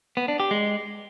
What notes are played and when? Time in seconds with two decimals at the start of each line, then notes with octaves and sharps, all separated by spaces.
0.17 B3
0.28 D4
0.40 G4
0.51 G#3